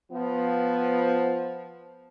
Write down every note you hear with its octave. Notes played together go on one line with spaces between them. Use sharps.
F3 B3